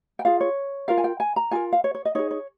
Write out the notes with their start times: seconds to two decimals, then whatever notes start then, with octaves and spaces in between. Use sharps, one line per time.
0.19 G5
0.25 F4 G#4 F5
0.41 C#5
0.88 F4 A#4 F5
0.97 G#5
1.04 G5
1.20 G#5
1.36 A#5
1.51 F4 A#4 G#5
1.72 F5
1.84 C#5
1.95 C#5
2.05 D#5
2.15 D#4 G#4 C#5
2.31 C#5